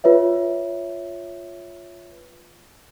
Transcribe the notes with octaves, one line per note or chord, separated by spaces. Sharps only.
F4 B4 C#5 E5